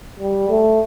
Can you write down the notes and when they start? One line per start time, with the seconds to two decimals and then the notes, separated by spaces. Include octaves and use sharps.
0.20 G3
0.49 A3